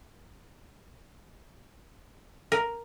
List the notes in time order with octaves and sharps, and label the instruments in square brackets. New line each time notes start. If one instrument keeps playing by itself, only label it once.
[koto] A#4